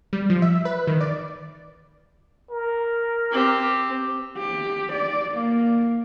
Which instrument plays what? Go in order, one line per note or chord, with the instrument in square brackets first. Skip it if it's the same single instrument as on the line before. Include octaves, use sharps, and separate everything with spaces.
[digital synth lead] G3
F3
E5
B4
D#3
D5
[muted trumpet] A#4
[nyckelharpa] C4 G4
[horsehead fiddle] G4
D5
A#3